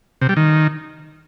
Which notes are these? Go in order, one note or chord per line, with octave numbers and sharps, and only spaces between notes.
C3
G3
D#3